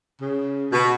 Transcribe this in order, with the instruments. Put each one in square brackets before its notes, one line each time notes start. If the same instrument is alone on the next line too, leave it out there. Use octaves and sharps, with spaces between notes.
[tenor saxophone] C#3
[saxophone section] B2 [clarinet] F#4